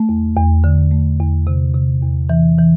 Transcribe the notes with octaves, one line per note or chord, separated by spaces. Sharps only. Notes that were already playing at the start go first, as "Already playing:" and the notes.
Already playing: A3
E2
E2
D3
A3
E2
C3
C3
E2
E3
E3